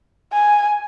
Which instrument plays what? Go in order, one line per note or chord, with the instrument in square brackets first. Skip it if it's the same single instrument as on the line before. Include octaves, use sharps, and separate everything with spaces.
[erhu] G#5